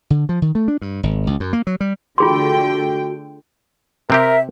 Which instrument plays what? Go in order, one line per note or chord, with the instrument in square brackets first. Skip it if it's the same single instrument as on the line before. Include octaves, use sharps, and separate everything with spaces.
[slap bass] D3
F3
D#3
A3
D4
G2
G#1
C#2
F#2
A#3
F#3
G3
[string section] D3 A3 G5 [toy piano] F4 G#4 C6 [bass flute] F#4
[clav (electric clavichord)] C3 C4 G4 [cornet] A#4 [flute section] E5